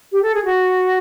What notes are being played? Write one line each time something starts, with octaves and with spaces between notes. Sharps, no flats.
G4
A4
G#4
F#4